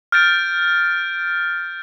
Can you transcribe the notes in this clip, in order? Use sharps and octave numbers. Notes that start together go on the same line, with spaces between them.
F6 G6 A6 D7